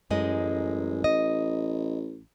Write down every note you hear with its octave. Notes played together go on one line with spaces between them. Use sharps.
A1 F#2 G#3 D#5
D#5